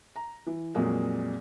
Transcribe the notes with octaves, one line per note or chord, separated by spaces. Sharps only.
A#5
E3
F2 A#2 F#3 G#3 A#3